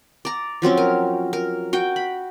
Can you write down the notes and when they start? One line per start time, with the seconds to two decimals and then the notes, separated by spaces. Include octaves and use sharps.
0.25 D5 A#5
0.62 F3 F#3 C4 C#4
0.77 A#4
1.33 A#4
1.73 F#4 G5
1.96 B5